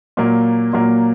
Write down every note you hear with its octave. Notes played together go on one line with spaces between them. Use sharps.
A#2 F#3 A#3
A#2 F#3 A#3